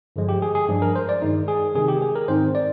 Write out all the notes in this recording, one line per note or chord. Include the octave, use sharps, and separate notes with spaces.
G2 D3 F3 G#3
G4
G#4
G#4
G2 F3 G#3 D4
A#4
C5
D5
G2 D#3 G#3 D#4
G#4
C3 D#3 G#3 G#4
G4
G#4
A#4
G#2 D#3 G#3 C4 D#4 C5
D5